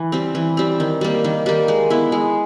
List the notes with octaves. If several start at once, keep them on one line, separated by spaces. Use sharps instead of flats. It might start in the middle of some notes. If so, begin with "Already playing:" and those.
Already playing: E3
G3 C4
E3
G3 C4
D#3
G3 A#3
D#3
G3 A#3
G#3
B3 E4
G#3